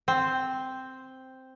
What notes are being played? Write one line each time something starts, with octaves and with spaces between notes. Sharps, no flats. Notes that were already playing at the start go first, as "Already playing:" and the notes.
C4